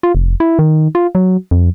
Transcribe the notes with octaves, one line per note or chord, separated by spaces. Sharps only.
F4
F1
E4
D#3
F4
F#3
F2